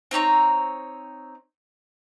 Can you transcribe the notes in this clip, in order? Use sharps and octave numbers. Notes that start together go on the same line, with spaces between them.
C4 D#4 C#5 A#5